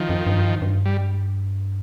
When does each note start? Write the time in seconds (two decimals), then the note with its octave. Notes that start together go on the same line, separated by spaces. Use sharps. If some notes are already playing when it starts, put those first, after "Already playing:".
Already playing: D#3 F3
0.09 F#2
0.26 G2
0.62 G2
0.85 G3